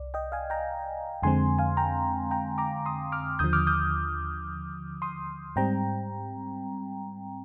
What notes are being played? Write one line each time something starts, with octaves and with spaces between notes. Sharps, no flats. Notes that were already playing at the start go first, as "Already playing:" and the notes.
Already playing: C2 D5
D#5 G5
F5 G#5
G5 A#5
F2 D3 G#3 C4 G#5 C6
F5 G#5
G5 A#5
G5 A#5
A#5 D6
C6 D#6
D6 F6
D#2 D3 F3 D#6 G6
D6 F6
D#6 G6
C6 D#6
G#2 G3 C4 G5 A#5